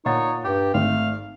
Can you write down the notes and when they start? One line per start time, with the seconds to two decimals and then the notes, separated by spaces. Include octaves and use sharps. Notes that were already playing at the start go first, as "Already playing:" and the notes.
0.06 A#2 D#4 C#5 F#5 A6
0.45 G2 G4 D6
0.74 G#1 A3 F5